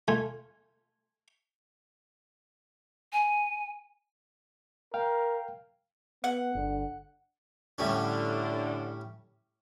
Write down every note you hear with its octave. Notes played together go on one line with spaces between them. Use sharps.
A3 F4 G#5
G#5
A#4 F5 G5
B3 F#5
G1 D3
A2 D3 G3 C#4